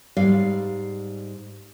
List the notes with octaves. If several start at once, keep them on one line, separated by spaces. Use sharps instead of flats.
G#2 G3 D5 F5